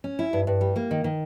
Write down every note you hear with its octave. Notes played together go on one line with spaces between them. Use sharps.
C#4
E4
G2
G2
G3
A#3
D#3
D#3